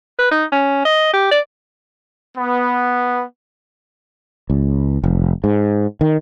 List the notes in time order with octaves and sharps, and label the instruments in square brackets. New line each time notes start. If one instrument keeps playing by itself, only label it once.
[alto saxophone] B4
D#4
C#4
D#5
G4
D5
[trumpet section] B3
[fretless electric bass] C#2
F1
G#2
D#3